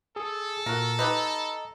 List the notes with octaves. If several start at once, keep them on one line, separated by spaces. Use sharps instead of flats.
G#4 A4
A#2 F#4 A#4
D#4 G4 B4 D#5 A#5